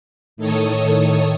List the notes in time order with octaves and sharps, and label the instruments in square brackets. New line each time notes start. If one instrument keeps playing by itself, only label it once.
[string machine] A2 D#3 A4 C#5 D#6